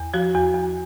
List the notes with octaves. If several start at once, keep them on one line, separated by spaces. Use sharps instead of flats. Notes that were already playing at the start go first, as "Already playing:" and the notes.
Already playing: E2
F3 F#4
E2
E2